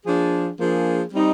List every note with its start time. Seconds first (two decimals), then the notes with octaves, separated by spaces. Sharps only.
0.06 F3 A#3 D4 G#4
0.59 F3 A#3 D4 G#4
1.12 G3 C4 D#4